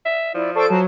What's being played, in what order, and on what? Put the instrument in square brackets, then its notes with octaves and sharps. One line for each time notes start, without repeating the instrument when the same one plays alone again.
[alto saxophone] E5
[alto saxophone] F3 [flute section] E4 D5
[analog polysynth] A4 D7 [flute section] C5 D5 C#6
[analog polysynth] F#3 [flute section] C5 A5